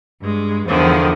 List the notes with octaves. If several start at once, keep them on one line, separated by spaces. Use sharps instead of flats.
G2 G#3
E2 D3 D#3 F3